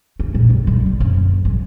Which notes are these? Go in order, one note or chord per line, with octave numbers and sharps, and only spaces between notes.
A3
A#2
G1
G3
C3
F#1
G#1